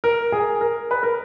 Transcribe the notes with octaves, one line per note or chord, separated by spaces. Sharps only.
A#4
G#4
A#4
B4
A#4